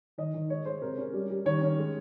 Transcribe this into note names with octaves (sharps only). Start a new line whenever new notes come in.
D#3 D#5
D#3
G#3 C#5
G#3 C5
C3 A#4
C#4
G3
G3
D#3 C#5
C#4
G#3